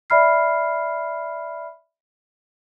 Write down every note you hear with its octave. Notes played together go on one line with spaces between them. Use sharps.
D5 E5 B5 F6 C7